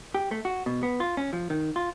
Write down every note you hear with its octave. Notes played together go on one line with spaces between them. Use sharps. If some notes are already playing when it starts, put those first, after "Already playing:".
G4
A3
F#4
B2
B3
F4
C#4
F3
D#3
F4